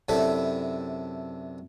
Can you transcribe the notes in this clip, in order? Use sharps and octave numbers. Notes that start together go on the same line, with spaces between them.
F#2 C3 D4 E4 A4 B5